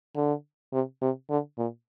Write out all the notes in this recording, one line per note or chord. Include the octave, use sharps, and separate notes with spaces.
D3
C3
C3
D3
A#2